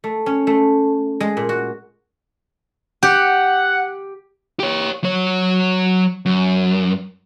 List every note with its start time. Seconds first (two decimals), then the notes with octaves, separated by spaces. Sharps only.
0.04 A3
0.26 C#4
0.47 A3
1.20 G#3
1.37 A#2
1.49 F#4
3.03 G4 F#5
4.60 G4 C#5
5.04 F#3 C#5
6.26 F#2